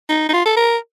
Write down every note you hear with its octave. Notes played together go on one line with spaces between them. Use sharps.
D#4
D#4
F4
A4
A#4